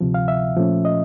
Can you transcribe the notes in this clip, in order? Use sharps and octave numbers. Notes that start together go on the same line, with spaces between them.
D2 C3 F3
F5
E5
A#2 F3 A3 C#4
D#5